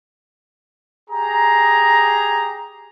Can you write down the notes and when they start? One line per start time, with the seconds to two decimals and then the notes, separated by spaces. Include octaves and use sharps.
1.10 G4 G#4 A#5